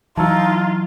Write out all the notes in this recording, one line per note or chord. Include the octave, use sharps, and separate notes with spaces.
E3 F#3 D#4 F4 A5 A#5 E6